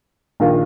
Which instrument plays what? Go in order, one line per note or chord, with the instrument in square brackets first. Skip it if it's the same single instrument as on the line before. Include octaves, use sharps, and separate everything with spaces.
[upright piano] A#1 D#3 A#3 F4